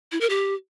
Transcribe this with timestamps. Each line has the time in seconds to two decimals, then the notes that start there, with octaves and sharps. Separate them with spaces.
0.12 E4
0.21 A#4
0.30 G4